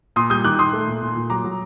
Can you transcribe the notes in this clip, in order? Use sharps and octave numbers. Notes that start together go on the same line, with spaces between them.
A#2 C6 D#6
G3 D#6 G6
D#3 D6 F#6
D#3 C6 D#6
A3
A#2
A#2
A#2
F#3 A#5 D6
F#3